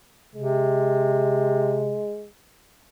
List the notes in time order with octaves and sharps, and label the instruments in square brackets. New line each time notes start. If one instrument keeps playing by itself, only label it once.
[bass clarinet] C3 [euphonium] G#3